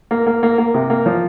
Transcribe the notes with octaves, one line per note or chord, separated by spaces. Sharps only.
A#3
A#3
A#3
A#3
C3
A#3
F3